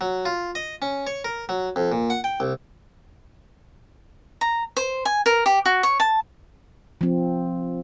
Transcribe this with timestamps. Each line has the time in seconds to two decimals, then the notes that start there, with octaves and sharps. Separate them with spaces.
0.01 F#3
0.25 F4
0.55 D#5
0.82 C#4
1.07 C#5
1.25 A#4
1.49 F#3
1.76 F2
1.92 A#2
2.10 F#5
2.24 G5
2.40 C2
4.41 A#5
4.77 C5
5.05 G#5
5.26 A#4
5.46 G4
5.65 F#4
5.83 C#5
6.00 A5
7.01 F3 C4